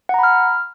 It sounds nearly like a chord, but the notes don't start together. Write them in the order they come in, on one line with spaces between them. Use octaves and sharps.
F#5 A#5 B5 F6